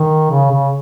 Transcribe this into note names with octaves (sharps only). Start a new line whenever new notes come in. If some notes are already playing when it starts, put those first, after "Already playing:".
Already playing: D#3
C#3
C#3